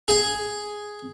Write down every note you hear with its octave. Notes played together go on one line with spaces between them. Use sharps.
G#4 G#5